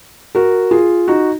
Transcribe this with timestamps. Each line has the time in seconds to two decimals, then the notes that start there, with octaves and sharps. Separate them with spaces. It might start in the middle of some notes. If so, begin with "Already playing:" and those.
0.35 F#4 A#4
0.71 F4 G#4
1.08 D#4 F#4